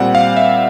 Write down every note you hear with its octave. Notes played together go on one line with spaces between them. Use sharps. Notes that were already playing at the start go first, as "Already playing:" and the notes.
Already playing: A#2 G3 C4 F#5
F5
E5